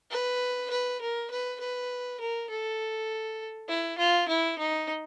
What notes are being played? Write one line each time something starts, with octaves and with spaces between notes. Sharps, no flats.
B4
B4
A#4
B4
B4
A#4
A4
E4
F4
E4
D#4